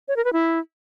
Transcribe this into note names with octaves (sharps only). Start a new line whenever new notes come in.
C#5
A#4
B4
E4